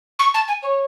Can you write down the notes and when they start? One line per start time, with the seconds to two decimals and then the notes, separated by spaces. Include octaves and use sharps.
0.19 C#6
0.34 A5
0.48 G#5
0.63 C#5